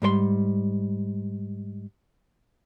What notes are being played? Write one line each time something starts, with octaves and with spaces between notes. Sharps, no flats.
G#2 G3 C5 C6